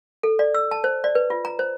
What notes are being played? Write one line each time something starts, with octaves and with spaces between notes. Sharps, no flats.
A4
D5
E6
A5
C5
D5
B4
F4
A#5
C5